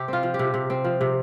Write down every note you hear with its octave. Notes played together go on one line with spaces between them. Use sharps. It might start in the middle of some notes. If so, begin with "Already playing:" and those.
Already playing: C3 G4
C4 F4
F3
G4
C3
C3
C4
F3
C3